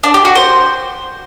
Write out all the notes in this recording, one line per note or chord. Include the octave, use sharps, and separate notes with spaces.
D4
G4
F#4
C5